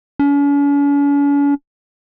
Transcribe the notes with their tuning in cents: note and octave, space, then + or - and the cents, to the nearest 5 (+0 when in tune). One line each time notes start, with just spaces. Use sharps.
C#4 +45